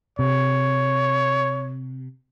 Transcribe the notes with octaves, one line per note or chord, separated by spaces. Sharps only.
C3 C#5